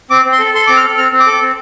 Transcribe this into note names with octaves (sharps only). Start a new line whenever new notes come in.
C4 D6
C4
C6
A4
A4 C6
C4 D6
F6
A4
C4 F6
C4
D6
A4
C4